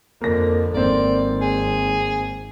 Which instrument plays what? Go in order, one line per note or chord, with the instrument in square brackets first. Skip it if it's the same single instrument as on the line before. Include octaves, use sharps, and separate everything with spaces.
[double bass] F2 D3 [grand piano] A#3 A#6
[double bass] G#1 [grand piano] A#3 C4 [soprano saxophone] D5
[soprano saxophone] G#4